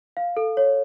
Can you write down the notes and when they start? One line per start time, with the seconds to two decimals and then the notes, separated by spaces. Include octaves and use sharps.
0.17 F5
0.37 A4
0.57 C#5